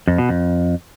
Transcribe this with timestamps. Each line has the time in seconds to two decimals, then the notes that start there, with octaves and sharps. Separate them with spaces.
0.07 F2
0.18 B2
0.29 F2